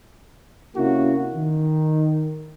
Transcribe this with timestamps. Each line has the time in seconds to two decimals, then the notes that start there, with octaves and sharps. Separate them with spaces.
0.75 C3 A#3 C#4 E4 F#4
1.34 D#3